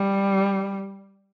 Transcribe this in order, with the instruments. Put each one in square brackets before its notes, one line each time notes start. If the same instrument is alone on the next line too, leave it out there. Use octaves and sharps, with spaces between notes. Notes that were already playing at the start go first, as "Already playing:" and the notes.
Already playing: [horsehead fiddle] G3